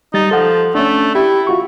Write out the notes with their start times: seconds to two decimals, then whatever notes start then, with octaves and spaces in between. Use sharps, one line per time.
0.14 G3 D#4 A6
0.31 F3 A4 F#5
0.75 A3 C#4 D4
1.15 E4 G4
1.47 F4 F#4 C#6